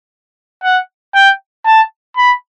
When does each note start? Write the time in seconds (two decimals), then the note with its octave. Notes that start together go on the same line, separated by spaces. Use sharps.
0.63 F#5
1.14 G5
1.66 A5
2.17 B5